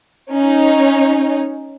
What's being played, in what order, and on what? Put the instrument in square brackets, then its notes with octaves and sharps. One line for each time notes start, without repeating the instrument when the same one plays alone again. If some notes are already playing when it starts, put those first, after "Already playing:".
[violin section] C#4 D#4